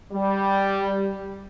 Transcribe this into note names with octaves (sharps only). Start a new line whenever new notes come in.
G3